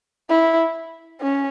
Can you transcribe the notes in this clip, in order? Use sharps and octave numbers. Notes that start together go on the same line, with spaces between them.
E4
C#4